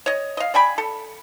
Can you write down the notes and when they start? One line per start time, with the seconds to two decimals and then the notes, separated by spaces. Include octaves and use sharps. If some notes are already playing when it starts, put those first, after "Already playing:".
0.06 C#5 D#5
0.37 D#5 F5
0.54 D5 G5 G#5 B5
0.78 A4